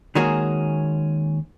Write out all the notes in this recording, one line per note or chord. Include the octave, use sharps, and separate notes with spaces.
D#3 G#3 A#3 C#4 F#4 G#4